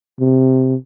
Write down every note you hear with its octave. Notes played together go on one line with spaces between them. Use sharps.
C3